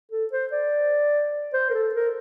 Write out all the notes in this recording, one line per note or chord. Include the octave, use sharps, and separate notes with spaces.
A4
C5
D5
C5
A#4
A4
A#4